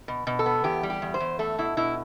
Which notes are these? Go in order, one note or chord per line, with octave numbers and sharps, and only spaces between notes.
B2
B2
A4
B3
E2 G4
G3
G4
E2
C5
E2
A3 A4
B2 E4
B2 E4